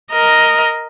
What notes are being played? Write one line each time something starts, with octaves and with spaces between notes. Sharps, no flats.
A#4 D#5